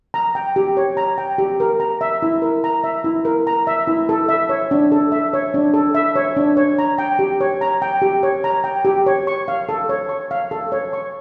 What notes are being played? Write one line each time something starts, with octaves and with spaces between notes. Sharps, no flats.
A#5
G5
G4
C#5
A#5
G5
G4
A#4
A#5
E5
E4
A#4
A#5
E5
E4
A#4
A#5
E5
E4
A4
E5
C#5
D4
A4
E5
C#5
D4
A4
E5
C#5
D4
C#5
A#5
G5
G4
C#5
A#5
G5
G4
C#5
A#5
G5
G4
C#5
C#6
F5
A4
C#5
C#6
F5
A4
C#5
C#6